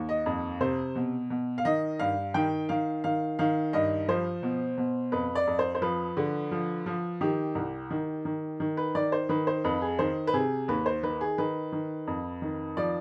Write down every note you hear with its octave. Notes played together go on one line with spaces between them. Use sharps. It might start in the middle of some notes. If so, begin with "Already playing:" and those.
Already playing: D#2
D#5
F2
C3 C5
B2
B2
F5
D#3 D#5
G2 F5
D#3 G5
D#3 F5
D#3 F5
D#3 F5
G2 D#5
F3 C5
B2
B2
F2 B4
D5
F2
C5
C5
F3 B4
D3
F3
F3
D#3 G4
C2
D#3
D#3
D#3
B4
D#3 D5
C5
D#3 B4
C5
F2 B4
G#4
D#3 C5
B4
C3 G#4
D#2 B4
C5
D#3 B4
G#4
D#3 B4
D#3
F2
D#3
F3 D5